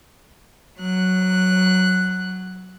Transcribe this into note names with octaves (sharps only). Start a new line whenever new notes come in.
F#3 F#6